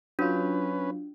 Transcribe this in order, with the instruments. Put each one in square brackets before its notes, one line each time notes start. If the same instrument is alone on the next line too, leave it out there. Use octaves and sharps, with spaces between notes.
[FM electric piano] F#3 F4 [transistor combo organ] C#4 B4 [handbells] D4